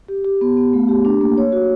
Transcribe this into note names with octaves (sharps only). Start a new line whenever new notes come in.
G4
G4
B3
B3
A3
G4
D4
A#3
C#5
F#4